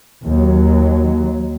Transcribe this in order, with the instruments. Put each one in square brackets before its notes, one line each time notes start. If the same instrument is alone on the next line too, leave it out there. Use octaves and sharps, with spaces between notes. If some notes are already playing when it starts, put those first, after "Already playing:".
[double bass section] D#2 F#3